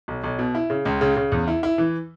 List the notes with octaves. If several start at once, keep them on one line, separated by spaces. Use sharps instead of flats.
B1
B1
B2
E4
C#3
C#2
C#3
C#3
E2
E4
E4
E3